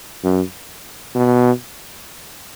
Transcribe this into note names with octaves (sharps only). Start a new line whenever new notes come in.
F#2
B2